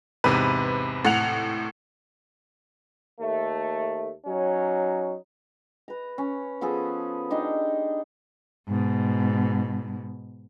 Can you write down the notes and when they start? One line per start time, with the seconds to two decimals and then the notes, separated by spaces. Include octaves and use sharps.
0.24 E2 G#2 C3 B4
1.05 A2 F#5 F7
3.20 D#2 A3
4.26 F#3 C#4 D#4
5.88 B4 A#5
6.18 C#4
6.61 F3 B3 G#4 A4
7.31 D4 D#4 G4 C6
8.68 G#2 B2